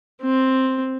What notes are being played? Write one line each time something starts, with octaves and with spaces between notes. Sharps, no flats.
C4